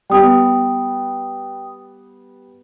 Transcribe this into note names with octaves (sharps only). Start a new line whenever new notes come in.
G3 B3 G5 D#6